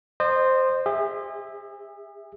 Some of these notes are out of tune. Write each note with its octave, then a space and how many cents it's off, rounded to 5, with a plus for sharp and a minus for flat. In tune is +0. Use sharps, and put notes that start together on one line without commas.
C5 +0 D#5 -35
G#4 -40 E5 -10